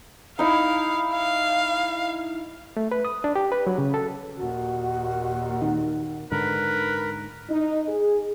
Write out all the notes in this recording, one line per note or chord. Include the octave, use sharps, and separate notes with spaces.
D#4 E4 F5
F5
A3
B4
D#6
D4
G4
B4
F#3
C#3
A4
D#2 A#2 F#4
D#3 F#5
G#2 D3 A#4 B4
D#4
G#4